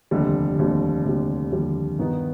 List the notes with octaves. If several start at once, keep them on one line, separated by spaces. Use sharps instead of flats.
F1 D#2 D3 G3
F1 D#2 D3 G3
F1 D#2 D3 G3
F1 D#2 D3 G3
G2 D#3 B3 D#4